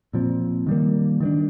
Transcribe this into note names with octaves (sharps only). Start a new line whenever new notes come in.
A#2 F3 C4
D#3 G3 A#3
D#3 G3 A#3 D4